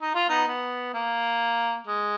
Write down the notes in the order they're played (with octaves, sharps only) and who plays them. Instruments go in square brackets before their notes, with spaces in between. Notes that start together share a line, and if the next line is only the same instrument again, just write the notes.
[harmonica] D#4
F4
B3 D#4
B3
A#3
G#3